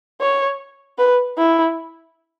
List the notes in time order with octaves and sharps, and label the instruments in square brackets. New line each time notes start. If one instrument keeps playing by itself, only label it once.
[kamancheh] C#5
B4
E4